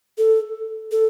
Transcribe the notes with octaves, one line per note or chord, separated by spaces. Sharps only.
A4
A4